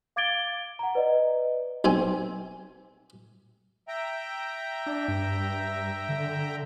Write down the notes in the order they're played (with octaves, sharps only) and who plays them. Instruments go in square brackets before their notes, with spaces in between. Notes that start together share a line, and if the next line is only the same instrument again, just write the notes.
[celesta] F5 D6 G#6 A6 D7 G7
F#5 A#5
B4 D5 D#5
[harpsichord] B1 C4 G#5
[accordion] E5 G5 A#5
[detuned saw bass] D4
G2
D3